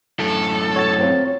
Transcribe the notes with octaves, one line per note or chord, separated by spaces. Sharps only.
F#2 A2 A4
F#4 C#5 A6
F#3 C4 F4